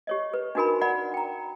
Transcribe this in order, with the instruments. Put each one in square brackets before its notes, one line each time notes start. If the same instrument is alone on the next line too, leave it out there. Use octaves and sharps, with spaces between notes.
[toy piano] G4 C#5 D#5
B4
D4 D#4 F#4 A#4 G#5 B5
D5 F#5 B5
G5 A#5